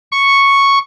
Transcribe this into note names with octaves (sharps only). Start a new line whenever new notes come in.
C#6